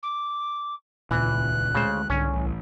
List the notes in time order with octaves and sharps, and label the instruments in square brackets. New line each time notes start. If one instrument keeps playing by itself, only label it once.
[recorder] D6
[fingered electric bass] D#1 C#2 [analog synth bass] A#2 [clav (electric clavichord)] E3 [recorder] F#6
[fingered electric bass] D2 G#3 [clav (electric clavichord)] C#3 C5
[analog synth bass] C2 [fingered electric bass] G#2 D3 [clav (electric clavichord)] C#4
[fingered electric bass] A1